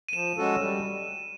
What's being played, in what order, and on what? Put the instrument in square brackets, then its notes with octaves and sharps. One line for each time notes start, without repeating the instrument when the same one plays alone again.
[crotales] D#7
[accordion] F3 [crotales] E7
[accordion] G#3 C#4 F#4 A4
G3